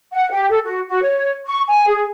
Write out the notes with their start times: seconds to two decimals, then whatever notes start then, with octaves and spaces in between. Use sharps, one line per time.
0.12 F#5
0.31 G4
0.50 A4
0.64 F#4
0.87 F#4
1.02 C#5
1.46 C#6
1.67 G#5
1.87 G#4